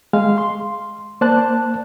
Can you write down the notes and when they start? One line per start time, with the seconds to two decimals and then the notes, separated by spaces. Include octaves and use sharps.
0.13 G#3 F5
0.38 C6
1.21 A#3 C5 D5 A5 F#6